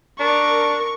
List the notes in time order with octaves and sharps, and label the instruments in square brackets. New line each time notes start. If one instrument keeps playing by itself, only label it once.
[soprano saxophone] D4 [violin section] A#4 [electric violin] C#6